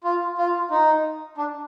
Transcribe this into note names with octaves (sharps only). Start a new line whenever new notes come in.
F4
F4
D#4
D4